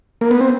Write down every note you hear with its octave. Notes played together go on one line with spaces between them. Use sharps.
A#3
B3
C4